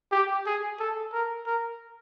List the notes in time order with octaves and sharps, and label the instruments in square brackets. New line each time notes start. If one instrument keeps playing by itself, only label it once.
[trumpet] G4
G#4
A4
A#4
A#4